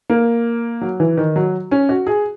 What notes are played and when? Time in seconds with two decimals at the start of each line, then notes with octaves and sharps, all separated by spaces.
0.10 A#3
0.81 F#3
1.00 E3
1.17 D#3
1.36 F#3
1.71 C#4
1.89 F#4
2.07 G#4